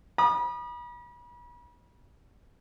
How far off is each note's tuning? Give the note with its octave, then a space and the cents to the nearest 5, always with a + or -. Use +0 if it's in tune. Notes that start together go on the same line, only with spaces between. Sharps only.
B5 -40 D#6 -35